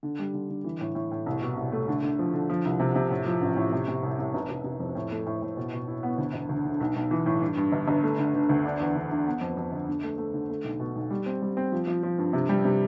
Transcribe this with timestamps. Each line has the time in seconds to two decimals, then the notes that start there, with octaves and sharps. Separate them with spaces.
0.03 D3
0.19 G3
0.34 D3
0.50 D3
0.64 E3
0.81 A2
0.95 A2
1.11 A2
1.26 C2
1.42 B2
1.57 C2
1.72 A3
1.88 D3
2.03 D3
2.19 F3
2.34 D3
2.49 F3
2.65 C2
2.80 C3
2.95 C3
3.11 A2
3.26 F3
3.42 A1
3.56 A2
3.72 C3
3.88 C3
4.03 C2
4.19 C2
4.34 F1
4.49 F1
4.64 F1
4.80 F2
4.95 A2
5.11 A3
5.26 A2
5.42 A2
5.57 B2
5.73 B2
5.88 E4
6.03 B3
6.18 D2
6.34 E1
6.49 D2
6.65 D3
6.81 B1
6.96 B1
7.11 E3
7.26 A2
7.42 G2
7.57 G2
7.72 G1
7.88 G1
8.03 A3
8.18 D3
8.34 D3
8.49 D2
8.65 D4
8.80 E2
8.95 D3
9.11 D3
9.27 B3
9.41 F2
9.57 F2
9.72 G1
9.88 D3
10.03 A3
10.18 A3
10.34 D3
10.50 A3
10.64 B1
10.80 B2
10.96 B1
11.10 G3
11.26 C4
11.42 G3
11.57 C4
11.72 F3
11.87 F3
12.03 F3
12.18 G2
12.33 C3
12.49 G3
12.65 C3